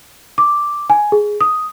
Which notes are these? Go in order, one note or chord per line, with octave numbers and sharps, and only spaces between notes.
D6
G#5
G#4
D#6